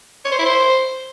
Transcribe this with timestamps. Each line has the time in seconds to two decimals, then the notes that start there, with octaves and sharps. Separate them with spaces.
0.25 C#5
0.32 C5
0.39 E4
0.46 C5